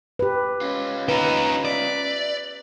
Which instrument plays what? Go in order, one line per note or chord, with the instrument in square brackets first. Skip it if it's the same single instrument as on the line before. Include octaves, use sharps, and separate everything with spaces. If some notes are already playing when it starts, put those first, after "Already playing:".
[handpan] G4 B4
[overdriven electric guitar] C#4 F4
[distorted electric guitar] D#4 G4 [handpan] B4 [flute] A#5
[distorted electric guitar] D5 [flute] E5